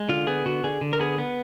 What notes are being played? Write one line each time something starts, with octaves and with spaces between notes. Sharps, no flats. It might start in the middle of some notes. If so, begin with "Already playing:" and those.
Already playing: G#3
D3 F4
B3 G#4
D3 F#4
D3 G#4
D3
A#4
B3 G#4
B3